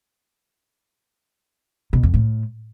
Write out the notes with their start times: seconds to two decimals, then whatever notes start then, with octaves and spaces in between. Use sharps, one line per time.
1.93 B2
2.03 F2
2.14 A2